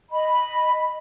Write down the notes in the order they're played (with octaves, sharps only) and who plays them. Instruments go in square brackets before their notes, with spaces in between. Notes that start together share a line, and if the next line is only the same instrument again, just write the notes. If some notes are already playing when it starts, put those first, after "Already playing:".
[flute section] D#5 B5